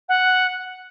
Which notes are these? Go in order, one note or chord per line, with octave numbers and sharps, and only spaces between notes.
F#5